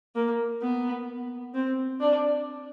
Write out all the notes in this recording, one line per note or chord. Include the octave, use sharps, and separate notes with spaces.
A#3
B3
C4
D4